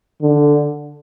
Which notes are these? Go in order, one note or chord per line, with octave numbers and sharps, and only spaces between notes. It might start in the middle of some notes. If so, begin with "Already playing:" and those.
D3